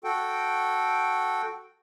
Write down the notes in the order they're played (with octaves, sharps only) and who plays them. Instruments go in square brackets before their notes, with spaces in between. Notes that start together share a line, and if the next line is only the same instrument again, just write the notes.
[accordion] F#4 A4 G5